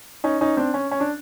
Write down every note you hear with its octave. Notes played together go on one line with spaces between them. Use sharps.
C#4 D#4
C#4 D#4
C4 D4
C#4
C#4
D4